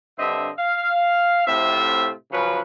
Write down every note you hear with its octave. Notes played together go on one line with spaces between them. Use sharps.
G2 D3 C4 D#5 E5
F5
A2 C3 A3 C4 F4 E5
C#3 F3 F#3 C#4 B4